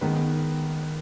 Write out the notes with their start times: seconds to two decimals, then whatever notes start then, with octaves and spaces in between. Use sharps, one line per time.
0.01 D#3 G#3 B3 B4